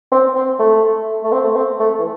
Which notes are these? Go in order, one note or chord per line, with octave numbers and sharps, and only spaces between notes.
C4
C4
A3
A3
C4
A3
C4
A3
E3